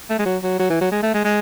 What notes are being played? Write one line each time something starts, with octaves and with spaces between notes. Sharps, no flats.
A3
G#3
F#3
F#3
F#3
E3
F#3
G#3
A3
G#3
G#3